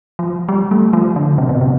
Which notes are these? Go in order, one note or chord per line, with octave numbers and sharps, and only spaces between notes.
F3
G3
A3
F3
D3
C3
B2
C3